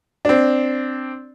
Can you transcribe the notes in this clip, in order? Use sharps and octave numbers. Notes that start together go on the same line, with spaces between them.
C4 D4